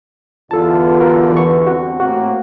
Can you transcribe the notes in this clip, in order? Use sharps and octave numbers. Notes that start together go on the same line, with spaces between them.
E2 G2 D3 F4 A4 A5
F#4 A#4
E3 C#6
C4 F#4
A2 A#3 C4 F#4